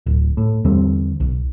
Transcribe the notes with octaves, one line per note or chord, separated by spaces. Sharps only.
D1
A2
E2 D3 G3 C4
B1